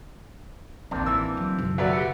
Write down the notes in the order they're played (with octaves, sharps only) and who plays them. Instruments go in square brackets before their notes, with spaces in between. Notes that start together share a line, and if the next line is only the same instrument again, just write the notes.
[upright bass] A1 D#3 [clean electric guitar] A#3 C4 D4
[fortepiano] E3 E6
[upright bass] D#3 F#3
F#1 B1
[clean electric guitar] D#2 A4 E5 [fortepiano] F#3 B4 D5
[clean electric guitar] G4 E5 F#5